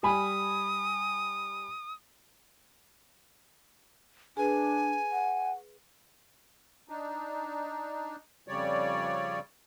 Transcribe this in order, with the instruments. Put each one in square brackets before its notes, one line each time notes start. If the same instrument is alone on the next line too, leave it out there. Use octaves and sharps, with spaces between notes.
[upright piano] G3 G#5 B5 [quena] D#6
[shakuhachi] D4 [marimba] G#4 B4 [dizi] G#5
[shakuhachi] F#5
[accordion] D4 D#4
F2 C#3 G3 C#5 D5